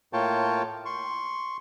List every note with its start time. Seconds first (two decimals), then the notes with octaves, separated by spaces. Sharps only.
0.13 A2 A#3 F4 C#5 G5 A5
0.85 C6 C#6